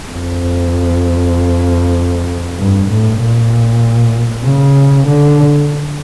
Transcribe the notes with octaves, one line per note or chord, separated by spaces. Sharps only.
F2
G2
A2
A#2
C#3
D3